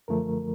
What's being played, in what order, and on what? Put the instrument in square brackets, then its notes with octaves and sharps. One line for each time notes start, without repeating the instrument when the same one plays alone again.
[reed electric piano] F#2 D3 F3 A3 A#4